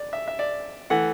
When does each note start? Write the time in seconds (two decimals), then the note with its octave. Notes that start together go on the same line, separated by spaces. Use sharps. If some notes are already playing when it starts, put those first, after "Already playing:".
Already playing: D5
0.13 E5
0.28 E5
0.39 D5
0.90 E3 A3 F#5